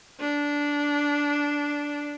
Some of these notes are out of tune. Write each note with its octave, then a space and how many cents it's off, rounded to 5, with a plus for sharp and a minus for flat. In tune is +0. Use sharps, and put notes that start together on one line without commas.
D4 -10